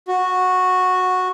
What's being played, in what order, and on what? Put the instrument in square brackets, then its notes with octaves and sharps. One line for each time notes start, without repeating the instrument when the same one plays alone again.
[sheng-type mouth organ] F#4